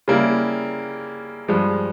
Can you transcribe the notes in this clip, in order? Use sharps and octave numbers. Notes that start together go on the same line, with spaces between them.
C#3 G3 A#3 E4
G2 F3 G#3